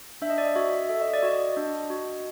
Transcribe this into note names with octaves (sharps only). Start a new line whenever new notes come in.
D4 E5
D#5
D5
D#5
F#4 E5
A4 E5
D#5
D5
F#4 D#5
D4
F#4